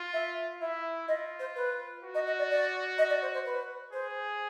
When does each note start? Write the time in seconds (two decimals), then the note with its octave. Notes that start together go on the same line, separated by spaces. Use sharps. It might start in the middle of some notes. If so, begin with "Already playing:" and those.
Already playing: F4
0.13 E5
0.61 E4 E5
1.08 F4 D#5
1.40 C5
1.56 B4
2.03 F#4
2.15 D#5
2.27 D#5
2.39 D5
2.51 D5
2.98 D#5
3.10 D5
3.22 C5
3.34 C5
3.45 B4
3.93 G#4 C5